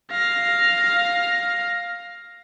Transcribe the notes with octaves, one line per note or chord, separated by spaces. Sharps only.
F5 A#6